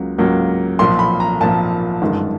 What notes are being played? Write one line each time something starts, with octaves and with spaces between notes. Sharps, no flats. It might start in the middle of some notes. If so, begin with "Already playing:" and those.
Already playing: C#2 C#3 F#3 A#3
C#2 C#3 F#3 A#3
B1 A#2 F3 C6
B5
A#5
B1 A#2 F3 A5
G1 F#2 D#3 G#3